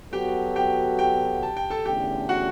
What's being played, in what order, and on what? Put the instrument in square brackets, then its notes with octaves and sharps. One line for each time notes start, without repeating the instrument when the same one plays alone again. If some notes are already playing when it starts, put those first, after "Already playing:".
[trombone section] F#3 B3 F#4 A4 [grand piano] G4 G5
[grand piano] G4 G5
G4 G5
A5
G5
A4 A5
[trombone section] E2 D3 A3 C#4 [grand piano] G4 G5
[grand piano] F#4 F#5